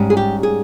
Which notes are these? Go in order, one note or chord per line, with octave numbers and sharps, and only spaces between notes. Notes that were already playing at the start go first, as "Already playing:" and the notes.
Already playing: G#2 G3 C#4
G#4
G4
G#4